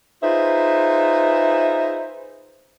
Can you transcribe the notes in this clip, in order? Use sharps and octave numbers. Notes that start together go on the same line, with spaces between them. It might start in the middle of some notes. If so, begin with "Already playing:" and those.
D#4 F4 G#4 B4 C5 E5